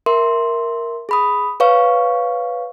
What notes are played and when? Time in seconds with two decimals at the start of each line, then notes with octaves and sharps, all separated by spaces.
0.06 A#4 E5 C6
1.09 G#4 B5 D#6
1.60 B4 C#5 F5 C#6